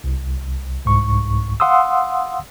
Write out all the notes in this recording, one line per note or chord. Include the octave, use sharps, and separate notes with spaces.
C2
C2 G#2 C#6
F5 F#5 C6 D#6 E6